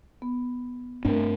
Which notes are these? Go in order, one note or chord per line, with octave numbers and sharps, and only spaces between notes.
B3
G2 A3 C4 D4 A#4